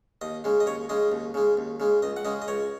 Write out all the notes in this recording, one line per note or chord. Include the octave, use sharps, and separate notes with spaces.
D#2 D#5
C#3 G#3
D#5
D#2 C#5
C#3 G#3 D#5
D#2
C#3 G#3
D#2
C#3 G#3
C#2 D#5
F#5
C#3 G#3 D#5
D#5
C#2 C#5